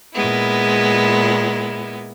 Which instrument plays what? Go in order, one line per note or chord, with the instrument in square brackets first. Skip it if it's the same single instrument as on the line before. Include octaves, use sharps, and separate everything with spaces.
[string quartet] A#2 G#3 B3 E4